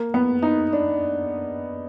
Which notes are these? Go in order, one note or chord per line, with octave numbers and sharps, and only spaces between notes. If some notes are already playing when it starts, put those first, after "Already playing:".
Already playing: A#3
B3
D#4
D4